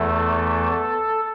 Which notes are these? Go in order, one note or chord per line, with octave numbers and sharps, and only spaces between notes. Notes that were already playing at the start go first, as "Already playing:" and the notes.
Already playing: E2 E3 A3 A4